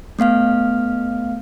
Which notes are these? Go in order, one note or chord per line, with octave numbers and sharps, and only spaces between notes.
A3 B3 F5 F6